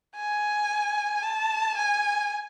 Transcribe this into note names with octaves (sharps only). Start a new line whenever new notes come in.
G#5
A5
G#5